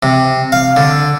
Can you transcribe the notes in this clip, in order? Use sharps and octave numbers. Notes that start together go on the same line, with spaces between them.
C3
F5
D3